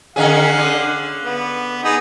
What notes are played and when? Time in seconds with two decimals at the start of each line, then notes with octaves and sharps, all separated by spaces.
0.16 D3 C#4 G#4 F5 F#5
0.57 D3
1.24 B3
1.84 B3 D#4 G#4